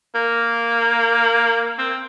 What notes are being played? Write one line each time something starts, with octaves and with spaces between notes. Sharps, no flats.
A#3
C4